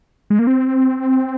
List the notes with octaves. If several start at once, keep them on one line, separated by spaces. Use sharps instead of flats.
G#3
A#3
C4